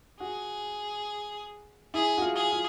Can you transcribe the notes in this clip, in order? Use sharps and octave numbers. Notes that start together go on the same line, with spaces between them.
F#4 G#4
E4 G#4
F#4
F4
G#4
F4